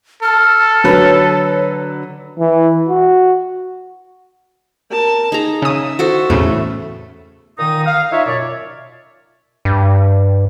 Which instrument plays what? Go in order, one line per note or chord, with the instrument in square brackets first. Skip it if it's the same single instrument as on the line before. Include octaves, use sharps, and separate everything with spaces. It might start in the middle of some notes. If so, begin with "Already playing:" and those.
[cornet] A4 [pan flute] F6
[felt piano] D3 F#3 B4 [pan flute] C#5
[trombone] E3
F#4
[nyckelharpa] A#4 A5
[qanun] D#4 A#5 [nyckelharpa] G#4
[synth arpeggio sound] C#3 D#6 [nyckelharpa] E5
[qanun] F#4 A4 C5
[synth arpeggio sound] E2 A2 C#3 [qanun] A3
[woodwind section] A#2 D#3 D#4 D#6
F5
D#4 F4 C#5 E5
F#2 B2 C#5 D5
[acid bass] G2